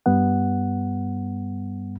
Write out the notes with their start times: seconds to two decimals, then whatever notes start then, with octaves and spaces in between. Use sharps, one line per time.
0.06 G2 G3 B3 F#5